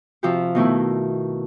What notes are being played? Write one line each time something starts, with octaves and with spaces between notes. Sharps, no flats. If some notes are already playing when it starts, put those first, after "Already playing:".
C3 F3 F#4 G4
B2 D#3 A3 E4